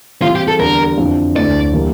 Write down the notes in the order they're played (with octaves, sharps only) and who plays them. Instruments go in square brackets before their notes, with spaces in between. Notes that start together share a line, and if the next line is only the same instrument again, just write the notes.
[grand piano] E3 G3 C4 [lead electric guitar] F4
[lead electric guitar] G4
A4
[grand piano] E2 D3 G3 [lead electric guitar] A#4
[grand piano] F2 D3 F3 C4 E4
[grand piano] D2 D3 A3 E4 [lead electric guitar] D5
[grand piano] E3 G3 A#3 D4